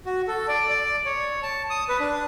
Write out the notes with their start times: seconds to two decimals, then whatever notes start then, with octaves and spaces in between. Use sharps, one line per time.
0.06 F#4
0.27 A4
0.48 D5
0.69 D5
1.06 C#5
1.43 A5
1.70 D#6
1.89 B4
2.00 D4